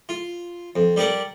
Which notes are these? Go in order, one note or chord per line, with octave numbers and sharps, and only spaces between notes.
F4
F2
G3 G4 A#4 D5 F#5